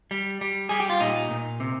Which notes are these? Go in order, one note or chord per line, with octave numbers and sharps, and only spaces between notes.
G3
G3
G3 G#4
G4
F4
A#2 D#4
A#2
C3